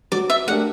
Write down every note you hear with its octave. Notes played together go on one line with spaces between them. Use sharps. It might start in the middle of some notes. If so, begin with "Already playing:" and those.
F#3 D5
E5
A3 D4 G4 A#4 F#5